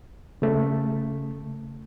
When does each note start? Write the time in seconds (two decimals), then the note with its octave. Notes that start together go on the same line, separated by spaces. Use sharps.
0.42 C#3 A3